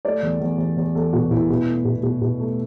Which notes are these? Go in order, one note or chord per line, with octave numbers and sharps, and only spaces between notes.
A3 D5
E2
E2
E2
E2
E2 A4
B2 F#4
B2 E4
B2
A3
B2
B2
B2
A3